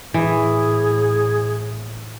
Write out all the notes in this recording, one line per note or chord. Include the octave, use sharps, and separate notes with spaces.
A2 E3 G#4